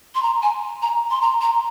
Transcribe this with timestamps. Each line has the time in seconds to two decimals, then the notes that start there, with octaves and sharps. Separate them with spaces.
0.15 C6
0.23 A#5
0.43 G#5
0.82 A#5
1.11 C6
1.21 A#5
1.41 A#5